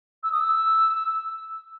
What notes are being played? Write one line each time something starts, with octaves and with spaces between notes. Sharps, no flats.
E6
D#6
E6